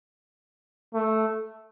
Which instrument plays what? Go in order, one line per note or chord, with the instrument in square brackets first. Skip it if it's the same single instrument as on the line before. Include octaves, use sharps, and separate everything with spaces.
[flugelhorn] A3